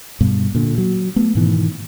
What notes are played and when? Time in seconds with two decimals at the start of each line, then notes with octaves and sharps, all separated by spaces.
0.21 G2 B2
0.55 A#2 D3
0.78 F#3
1.16 A3 B3
1.35 G#2 B2 D#3 E3